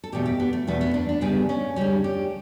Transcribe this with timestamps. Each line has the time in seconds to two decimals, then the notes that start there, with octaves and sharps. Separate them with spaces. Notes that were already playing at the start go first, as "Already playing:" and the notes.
0.04 A4
0.12 E2 B2 A3 G4
0.25 G4
0.40 B3
0.53 A3
0.67 E2 B2 A3 B3
0.81 B3
0.94 D4
1.09 D4
1.21 D2 C#3 G3 B3
1.49 C#4
1.76 D2 C#3 G3 C#4
2.04 G4